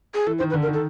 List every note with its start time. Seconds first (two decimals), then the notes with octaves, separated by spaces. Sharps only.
0.15 G#4
0.26 E3 A4
0.39 D#3 C5
0.50 B4
0.53 D3
0.62 A#4
0.68 D#3
0.74 A4